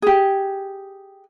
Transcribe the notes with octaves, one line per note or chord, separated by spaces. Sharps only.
G4 G#4